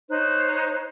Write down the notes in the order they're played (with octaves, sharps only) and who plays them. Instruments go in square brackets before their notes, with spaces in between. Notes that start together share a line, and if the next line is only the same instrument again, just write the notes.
[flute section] D#4 C5 C#5 F#6